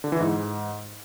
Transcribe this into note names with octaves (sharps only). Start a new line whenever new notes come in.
D3
E3
G#2